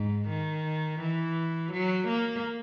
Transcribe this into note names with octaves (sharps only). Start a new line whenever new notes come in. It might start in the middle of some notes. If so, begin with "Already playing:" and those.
Already playing: G#2
D#3
E3
F#3
A#3